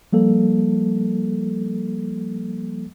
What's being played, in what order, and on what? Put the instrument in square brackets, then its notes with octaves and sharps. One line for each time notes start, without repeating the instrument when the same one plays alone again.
[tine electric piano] F3 G3 A#3 A4